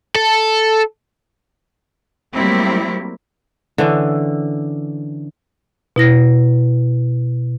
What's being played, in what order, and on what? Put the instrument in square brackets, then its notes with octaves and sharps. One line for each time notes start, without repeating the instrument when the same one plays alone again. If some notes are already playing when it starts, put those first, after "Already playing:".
[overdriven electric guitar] A4
[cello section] F#3 G3 A3 A#3 C4 E4
[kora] D3 E3 C#4
[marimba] B2 E4 A#6